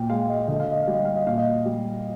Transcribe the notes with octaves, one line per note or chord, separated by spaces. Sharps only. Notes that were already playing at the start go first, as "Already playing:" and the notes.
Already playing: A#2 G5
G#3 F5
D#5
D3 D#5
F5
D#5
G3 F5
D#5
F5
D#5
A#2 F5
D#5
G3